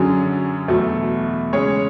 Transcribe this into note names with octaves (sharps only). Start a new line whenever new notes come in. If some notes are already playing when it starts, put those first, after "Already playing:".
Already playing: F#2 D3 F#3 C#4 G#4
E2 B2 F#3 A3
C#3 G#3 C#4 G#4 C#5